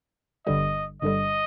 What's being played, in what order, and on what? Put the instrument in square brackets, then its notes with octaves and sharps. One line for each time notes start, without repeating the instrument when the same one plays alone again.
[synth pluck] G1 G2 D3 G3 [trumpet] D#5
[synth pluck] G1 G2 D3 G3 [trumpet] D#5